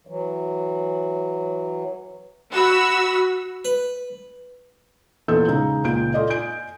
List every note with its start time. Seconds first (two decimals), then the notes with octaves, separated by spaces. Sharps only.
0.07 E3 F#3
2.54 F#4 B5 E6
3.65 B4
5.28 E2 A#2 F4 A4 E6 G6
5.48 C#3 G#3 D#4
5.84 C#2 A#2 G6 D7
6.14 F4 A4 D5 D#5
6.30 G#5 G6 D7